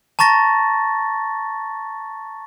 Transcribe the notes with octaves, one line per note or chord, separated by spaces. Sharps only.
A5 A#5 C#6 A6 A#6